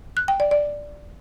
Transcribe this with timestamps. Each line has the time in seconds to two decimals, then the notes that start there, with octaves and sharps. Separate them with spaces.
0.17 F#6
0.28 G5
0.40 D5
0.51 D5